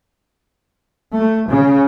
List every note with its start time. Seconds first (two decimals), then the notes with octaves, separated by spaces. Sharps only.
1.15 A3
1.50 C#3